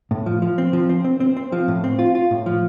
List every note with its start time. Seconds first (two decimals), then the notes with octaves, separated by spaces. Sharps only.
0.11 A2
0.26 F3
0.42 F3
0.58 C4
0.73 F3
0.89 C4
1.04 C4
1.20 C4
1.37 C4
1.52 F3
1.68 A2
1.84 C4
1.99 F4
2.15 F4
2.31 A2
2.46 F3